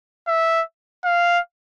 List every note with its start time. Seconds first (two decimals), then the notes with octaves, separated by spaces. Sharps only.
0.27 E5
1.04 F5